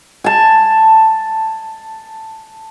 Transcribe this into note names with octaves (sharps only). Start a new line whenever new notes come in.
G#5 A5